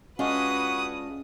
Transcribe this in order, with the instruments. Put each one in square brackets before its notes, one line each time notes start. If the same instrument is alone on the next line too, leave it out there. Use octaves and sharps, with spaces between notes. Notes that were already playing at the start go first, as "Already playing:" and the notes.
[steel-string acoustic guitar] G#3 D4 F4 [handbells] C#4 [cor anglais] F#4 [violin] B4 D#6